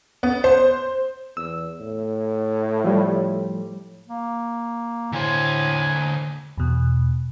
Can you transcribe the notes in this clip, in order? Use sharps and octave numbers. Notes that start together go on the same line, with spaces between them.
B3
C5
E2 E6
A2
F3 G3
A#3
A2 D3 C5 G#5
E2 B2